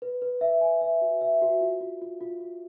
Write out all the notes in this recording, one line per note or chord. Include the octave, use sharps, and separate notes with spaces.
B4
B4
E5
G#5
E5
F#4
E5
F#4
F4
F4
F4
F4
F4